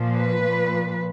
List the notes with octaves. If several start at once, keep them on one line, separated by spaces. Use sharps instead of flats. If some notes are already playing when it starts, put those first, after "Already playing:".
Already playing: A#2 F3
B4
A#2 F3